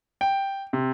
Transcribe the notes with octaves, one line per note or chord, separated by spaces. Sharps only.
G5
C3